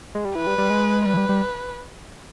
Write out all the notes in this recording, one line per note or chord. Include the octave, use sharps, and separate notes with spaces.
G#3
G3
E3 B4
G3
G3
G#3
G3 B4
E3
G3
G3